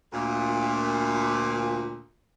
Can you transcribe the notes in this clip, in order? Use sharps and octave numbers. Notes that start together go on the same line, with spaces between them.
D2 A#2